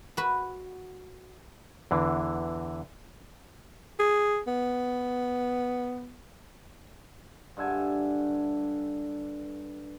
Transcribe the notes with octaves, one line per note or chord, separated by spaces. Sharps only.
F#4 B4
E2 D3 E3
G#4
B3
G2 D3 E5 G#5